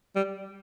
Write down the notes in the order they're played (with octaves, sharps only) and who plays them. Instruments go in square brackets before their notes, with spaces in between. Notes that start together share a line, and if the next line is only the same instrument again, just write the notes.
[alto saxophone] G3